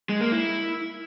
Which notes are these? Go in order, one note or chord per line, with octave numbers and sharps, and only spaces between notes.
G#3
A#3
E4